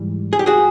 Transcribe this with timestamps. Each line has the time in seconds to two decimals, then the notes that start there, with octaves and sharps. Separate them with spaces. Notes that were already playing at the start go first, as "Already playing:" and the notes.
Already playing: G#2 E3 G3
0.33 G#4
0.39 G4
0.46 F#4 G#4